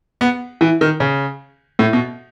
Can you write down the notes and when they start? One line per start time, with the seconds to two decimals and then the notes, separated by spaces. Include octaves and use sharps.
0.21 B3
0.61 E3
0.81 D#3
1.00 C#3
1.79 A2
1.93 B2